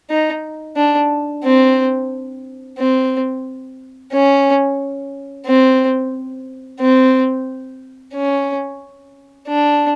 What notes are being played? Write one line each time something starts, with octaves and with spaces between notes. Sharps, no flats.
D#4
D4
C4
C4
C#4
C4
C4
C#4
D4